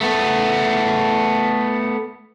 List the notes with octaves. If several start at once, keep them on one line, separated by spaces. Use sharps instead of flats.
A3 B3